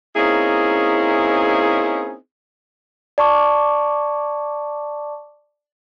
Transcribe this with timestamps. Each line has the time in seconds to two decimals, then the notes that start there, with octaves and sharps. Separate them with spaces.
0.16 A#3 C4 C#4 D#4 E4 G#4
3.18 D5 A5 C#6 D6